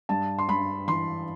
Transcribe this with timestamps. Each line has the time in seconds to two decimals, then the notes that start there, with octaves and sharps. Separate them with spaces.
0.09 G2 A5
0.39 C6
0.49 G2 B5
0.88 E3 C6